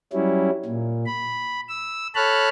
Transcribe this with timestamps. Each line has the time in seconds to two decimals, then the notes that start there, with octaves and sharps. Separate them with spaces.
0.13 F#3 G3 C#4 E4
0.65 A#2
1.06 B5
1.69 E6
2.15 A4 C#5 A5 B5 F6 F#6